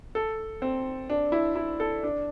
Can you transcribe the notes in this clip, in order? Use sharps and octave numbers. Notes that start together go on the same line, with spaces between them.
A4
C4
D4
E4
E4
A4
D4